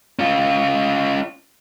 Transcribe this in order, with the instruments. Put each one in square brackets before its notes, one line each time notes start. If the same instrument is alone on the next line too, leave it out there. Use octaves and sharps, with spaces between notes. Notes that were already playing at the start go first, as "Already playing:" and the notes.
[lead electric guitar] C#4 F4